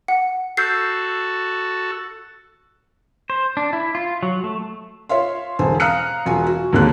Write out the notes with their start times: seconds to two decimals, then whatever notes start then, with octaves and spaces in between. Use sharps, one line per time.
0.08 F#5
0.57 F#4 A4 E6 G6 C7
3.30 C5
3.57 D4
3.73 E4
3.95 F4
4.23 F#3
4.44 A3
5.09 F4 C#5 E5 F5 C6
5.59 E1 D3 C5 G#5
5.80 F5 A#5 D#6 F6 F#6 C#7
6.26 E1 F4 F#4 G#5
6.47 F#4
6.73 D#2 G#2 D3 A#3 F#6